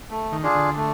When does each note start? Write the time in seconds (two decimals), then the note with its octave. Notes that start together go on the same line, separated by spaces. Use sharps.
0.10 A3
0.32 D#3
0.43 D4 F4 G#4
0.55 D3
0.77 A3